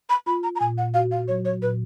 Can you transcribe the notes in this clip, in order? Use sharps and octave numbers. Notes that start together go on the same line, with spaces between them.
B5
F4 B5
A#5
A#5
A#2 G#5
F#5
F#4 F5
F5
F#3 C#5
C#5
A#2 B4